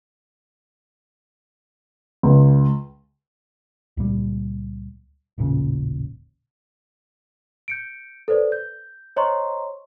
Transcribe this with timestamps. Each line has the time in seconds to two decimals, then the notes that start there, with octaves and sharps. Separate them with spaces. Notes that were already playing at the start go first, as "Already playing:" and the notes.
2.23 C#2
3.97 C#2 A#2 G3
5.38 D#1 A1 A#2 C#3
7.68 G6 C#7 D7
8.28 A4 B4 C5 D5
8.52 G6
9.16 C5 C#5 D#5 A#5 C6 C#6